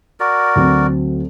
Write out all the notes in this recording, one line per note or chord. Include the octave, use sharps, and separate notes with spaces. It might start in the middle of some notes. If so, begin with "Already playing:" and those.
F#4 A#4 D5
D2 F#3 C4